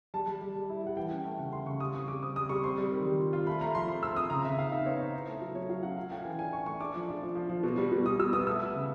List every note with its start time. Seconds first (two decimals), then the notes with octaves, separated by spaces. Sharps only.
0.14 G3 A5
0.28 G3
0.41 G3
0.56 G3
0.70 E4
0.83 G3 F#5
0.97 E3 G5
1.11 C#4
1.25 A3
1.38 C#3 F#5
1.53 A3 C6
1.66 C#3 C#6
1.80 G3 D#6
1.94 C4 C#6
2.08 G3 D6
2.22 C4 D#6
2.36 G3 D#6
2.49 G3 C#6
2.64 C4 C6
2.78 G3
2.91 D#3
3.06 G3
3.20 F4
3.33 F4
3.47 A3 B5
3.61 A3 A#5
3.74 F3 C6
3.88 C4 C6
4.02 C4 E6
4.16 C4 D#6
4.30 C#3 A#5
4.44 C#3 E5
4.58 D#4 F5
4.72 D#4 E5
4.86 B3 C#5
5.00 D#4 C5
5.14 E4
5.28 A3
5.42 F#3
5.55 F#3 C#5
5.70 F#3 F5
5.83 C#4 F#5
5.97 F4 F5
6.10 A3 G5
6.25 E3 G#5
6.39 D4 G#5
6.52 D4 C#6
6.66 A3 C#6
6.80 D4 D6
6.94 F3
7.08 D4
7.22 F3
7.35 F3
7.50 F3
7.63 B2
7.77 G3
7.92 B2
8.06 G3 D#6
8.19 B2 E6
8.33 B3 D#6
8.47 A3 E6
8.61 A3
8.75 C#3